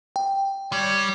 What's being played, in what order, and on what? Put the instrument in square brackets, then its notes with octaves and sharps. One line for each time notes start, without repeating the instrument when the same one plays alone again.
[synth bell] G5
[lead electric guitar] G3 [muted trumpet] C#5